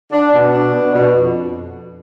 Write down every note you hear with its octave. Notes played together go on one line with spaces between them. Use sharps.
D4
B2
D4
B2
B2
F2